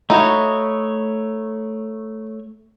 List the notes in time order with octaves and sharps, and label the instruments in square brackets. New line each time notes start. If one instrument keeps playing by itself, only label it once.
[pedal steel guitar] A3 C#5 [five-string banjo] D#4 E4 F#4